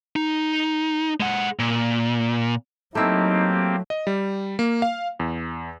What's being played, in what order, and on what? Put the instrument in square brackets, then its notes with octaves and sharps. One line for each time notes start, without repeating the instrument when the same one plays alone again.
[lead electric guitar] D#4
G#3 F#5
A#2
[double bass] F#3 [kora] A3 E4 [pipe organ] A#3 C4 G4 [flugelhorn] D#4
[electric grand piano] D#5
G3
A#3
F5
E2